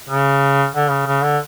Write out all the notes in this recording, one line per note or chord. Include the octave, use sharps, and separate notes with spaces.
C#3
D3
C#3
C#3
D3